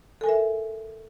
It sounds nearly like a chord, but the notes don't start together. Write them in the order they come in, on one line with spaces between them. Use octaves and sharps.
A4 G#5 A#4 E5